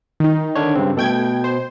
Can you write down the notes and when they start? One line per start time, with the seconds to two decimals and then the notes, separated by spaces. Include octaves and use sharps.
0.20 D#3 D#4
0.55 D3 D4 C#5
0.75 G2 C#3 C4
0.97 B2 A3 G5 G#6
1.44 C5